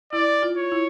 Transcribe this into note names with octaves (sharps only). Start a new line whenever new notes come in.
E4 D5
F4
C#5
E4